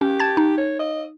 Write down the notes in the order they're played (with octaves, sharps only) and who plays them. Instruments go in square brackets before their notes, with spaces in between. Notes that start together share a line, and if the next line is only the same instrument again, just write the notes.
[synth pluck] C#4 [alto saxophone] G4
[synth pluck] A5 G#6 A6
D#4
[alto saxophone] C#5
D#5